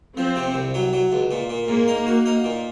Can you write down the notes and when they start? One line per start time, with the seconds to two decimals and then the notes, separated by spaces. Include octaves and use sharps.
0.17 F3 C4
0.36 C3
0.54 C2
0.74 F#3
0.93 F#3
1.12 C#2
1.31 A#2
1.49 A#2
1.68 G#2 A#3
1.88 D#4
2.07 F#4
2.26 D#4
2.44 A#2